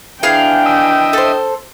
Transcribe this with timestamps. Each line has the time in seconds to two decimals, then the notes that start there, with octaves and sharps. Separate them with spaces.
0.23 E3 D4 G#4 F5 G5
0.66 D#5 E5
1.13 A4 C5